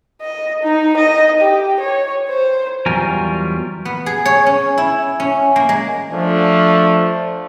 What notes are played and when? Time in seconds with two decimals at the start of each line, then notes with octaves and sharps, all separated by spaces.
0.21 D#5
0.63 D#4
0.97 D#5
1.40 G4
1.80 C#5
2.29 C5
2.86 E2 F#3 G3 F4 A#4 G#5
3.85 B3
4.06 G#4
4.25 C#5
4.46 C#4
4.78 E4
5.20 C#4
5.56 A#3
5.69 G#3
6.12 F3 A3 D4